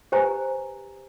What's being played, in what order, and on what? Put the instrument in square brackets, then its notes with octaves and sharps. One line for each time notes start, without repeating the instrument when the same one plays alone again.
[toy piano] G4 B4 C5 G#5 A#5